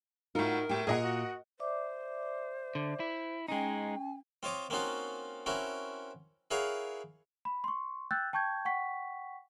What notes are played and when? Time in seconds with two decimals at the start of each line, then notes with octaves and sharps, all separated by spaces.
0.35 A2 D#4 F4 F#4 A#4
0.69 A2 E4 G4 G5
0.87 A#2 F4 G#4 A#4 D#5 F#5
1.04 F#4
1.60 C5 D5 E5 D6
2.75 D3
3.00 E4
3.48 G#3 C#4 D#4 G5 G#5
4.43 C4 F4 C#5 D#5 D6
4.70 A#3 C4 C#4 D#4 F4 F#4
5.46 C4 C#4 E4 F#4 A#4
6.51 E4 G#4 A#4 C#5 F5 F#5
7.45 B5
7.64 C6 C#6
8.11 G5 E6 F#6 G6 A6
8.33 G5 A5 C#6 G6 G#6
8.65 F#5 G5 C#6 B6